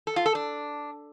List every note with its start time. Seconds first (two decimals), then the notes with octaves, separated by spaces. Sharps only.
0.07 A4
0.16 F4
0.26 A4
0.35 D4